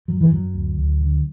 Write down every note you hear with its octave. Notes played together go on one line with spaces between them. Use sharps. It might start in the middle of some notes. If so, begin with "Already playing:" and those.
F#2 F#3
E3
F#2 F#3
D2
D2
D3